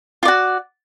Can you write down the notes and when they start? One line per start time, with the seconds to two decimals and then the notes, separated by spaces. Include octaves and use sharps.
0.23 F4
0.25 D5
0.28 F#4